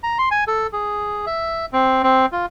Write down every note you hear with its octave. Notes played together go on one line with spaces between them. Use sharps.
A#5
C6
G#5
A4
G#4
E5
C4
C4
F4